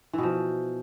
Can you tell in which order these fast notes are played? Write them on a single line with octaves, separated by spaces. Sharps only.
E3 B2 F3